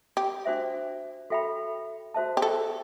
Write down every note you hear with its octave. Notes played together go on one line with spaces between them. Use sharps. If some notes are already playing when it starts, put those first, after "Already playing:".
G4
D4 F#4 C5 E5
F#4 A4 E5 G5 B5
F#4 C5 E5 A5
G4
A4